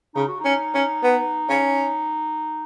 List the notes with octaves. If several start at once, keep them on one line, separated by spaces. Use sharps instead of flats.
C#3 D#4
F#4
C#4 D#4
C#4
B3
C#4